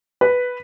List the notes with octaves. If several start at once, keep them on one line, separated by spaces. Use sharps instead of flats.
B4